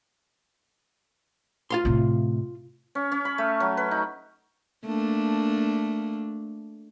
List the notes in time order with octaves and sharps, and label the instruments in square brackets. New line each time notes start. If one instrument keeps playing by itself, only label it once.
[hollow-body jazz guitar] F4 F5 C6
[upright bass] A2 C3
[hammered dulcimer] C#4
C#4
B5
A3
F#3
B4
D#4
[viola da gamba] A3 A#3 D4